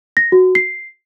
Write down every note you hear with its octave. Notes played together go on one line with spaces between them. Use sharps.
A#6
F#4
C7